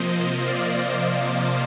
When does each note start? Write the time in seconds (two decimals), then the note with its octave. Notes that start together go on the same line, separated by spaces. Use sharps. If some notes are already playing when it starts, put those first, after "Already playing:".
Already playing: C3 F3 A#3 C5 D#5
0.47 D5 F5